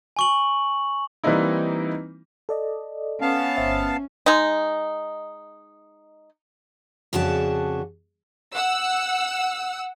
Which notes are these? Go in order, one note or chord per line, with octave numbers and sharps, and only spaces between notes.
G#5 C#6 F#7
E3 G3 A#3 C4 D#4 E4
A4 D5 D#5
B3 C#4 F5 A5
G1 C5 E5
G#3 D#4
F2 C#3 D4 F#4 G#4 A5
F#5 E6